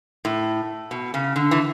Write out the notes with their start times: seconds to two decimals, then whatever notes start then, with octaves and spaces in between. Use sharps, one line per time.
0.25 A2
0.91 B2
1.14 C#3
1.36 D3
1.51 E3